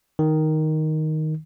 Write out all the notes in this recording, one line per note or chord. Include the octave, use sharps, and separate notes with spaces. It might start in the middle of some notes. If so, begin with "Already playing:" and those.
D#3